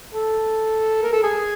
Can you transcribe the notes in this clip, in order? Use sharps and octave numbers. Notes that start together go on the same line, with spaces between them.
A4
A#4
A4
G#4